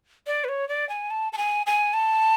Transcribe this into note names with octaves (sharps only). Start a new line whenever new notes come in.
D5
B4
C#5
D5
G#5
A5
A5
G#5
G#5
A5